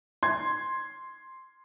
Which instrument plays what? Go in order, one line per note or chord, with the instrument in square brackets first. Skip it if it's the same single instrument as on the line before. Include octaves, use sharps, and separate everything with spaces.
[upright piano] C6 G#6